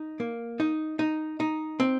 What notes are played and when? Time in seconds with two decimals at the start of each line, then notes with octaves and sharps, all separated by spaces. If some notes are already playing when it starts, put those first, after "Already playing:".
Already playing: D#4
0.20 A#3
0.60 D#4
0.99 D#4
1.40 D#4
1.80 C4